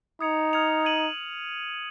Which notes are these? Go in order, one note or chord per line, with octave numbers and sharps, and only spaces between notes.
D#4 D#6 G#6 C#7 F7
F6 G#6 C#7 F7
G#6 D#7 F#7